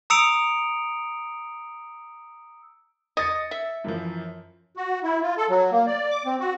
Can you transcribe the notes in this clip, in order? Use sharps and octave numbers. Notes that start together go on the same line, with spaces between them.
A#5 D#6 E6 C#7 D7 F7
D#5 G#6 A6 C#7
E5
F#2 E3 F3
F#4
E4
F4
A4
F#3
A#3
D5
D6
C4
F#4